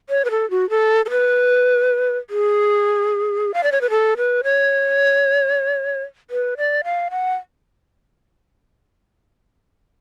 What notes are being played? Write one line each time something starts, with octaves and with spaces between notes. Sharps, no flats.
C#5
B4
A4
F#4
A4
A4
B4
G#4
F5
D5
C#5
B4
A4
B4
C#5
B4
D5
F5
F#5